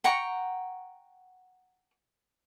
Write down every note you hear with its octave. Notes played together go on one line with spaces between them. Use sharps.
F#5 G5 A#5 C#6